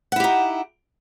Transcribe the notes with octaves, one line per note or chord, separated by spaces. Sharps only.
D#4 E4 G4 F#5